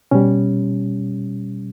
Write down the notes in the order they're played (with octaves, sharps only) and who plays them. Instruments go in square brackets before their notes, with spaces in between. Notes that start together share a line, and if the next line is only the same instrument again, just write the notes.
[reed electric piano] B2 G3 C#4